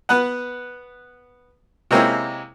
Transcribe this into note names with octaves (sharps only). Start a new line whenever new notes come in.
B3 B4 F#5
C3 G#3 A#3 C4 C#4 E4